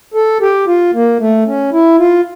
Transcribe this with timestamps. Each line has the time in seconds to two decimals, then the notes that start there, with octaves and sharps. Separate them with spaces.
0.14 A4
0.41 G4
0.67 F4
0.94 A#3
1.20 A3
1.46 C#4
1.73 E4
1.99 F4